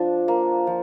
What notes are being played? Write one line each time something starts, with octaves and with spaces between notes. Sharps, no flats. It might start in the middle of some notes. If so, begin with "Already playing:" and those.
Already playing: F3 D4
A#3
F3